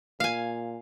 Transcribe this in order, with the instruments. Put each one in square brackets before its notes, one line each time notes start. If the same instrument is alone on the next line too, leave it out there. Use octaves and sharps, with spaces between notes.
[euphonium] A#2 [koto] F5 G#5